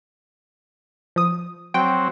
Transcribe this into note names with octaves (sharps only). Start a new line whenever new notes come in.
F3 D#6
F#3 C4 G5